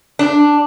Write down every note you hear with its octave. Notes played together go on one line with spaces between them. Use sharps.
D4